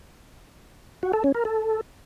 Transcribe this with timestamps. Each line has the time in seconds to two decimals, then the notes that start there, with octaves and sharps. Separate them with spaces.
1.03 F#4
1.13 A4
1.24 C#4
1.35 A#4
1.45 A4